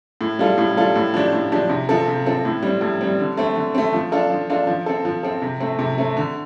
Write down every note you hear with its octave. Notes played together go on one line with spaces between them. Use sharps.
A2
G3 F4 A4
A2
G3 F4 A4
A2
F3 D4 G4
A2
F3 D4 G4
C3
F3 C4 A4
C3
F3 C4 A4
A2
G3 C4
A2
G3 C4
D3
A3 C4
D3
A3 C4
F3
D4 F4 A4
F3
D4 F4 A4
F3
C4 A4
F3
C4 A4
C3
A3 C4
C3
A3 C4
D3